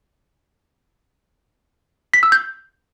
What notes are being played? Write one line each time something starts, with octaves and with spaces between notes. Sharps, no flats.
B6
E6
G6